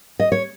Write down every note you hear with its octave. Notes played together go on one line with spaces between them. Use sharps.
D#5
C#5